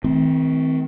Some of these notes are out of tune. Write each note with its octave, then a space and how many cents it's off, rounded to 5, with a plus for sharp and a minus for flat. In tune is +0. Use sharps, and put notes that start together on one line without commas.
D#3 +40 A3 -15 C4 -20